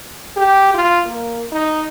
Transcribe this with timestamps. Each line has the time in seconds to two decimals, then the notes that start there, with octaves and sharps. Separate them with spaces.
0.37 G4
0.74 F4
1.06 A#3
1.52 D#4